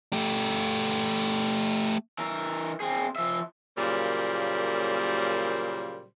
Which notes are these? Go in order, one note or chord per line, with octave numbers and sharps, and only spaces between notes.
A3 G4
E3 A#4
C4 G#4
F3 E5
A#2 C#3 F#3 G3 A#3 C5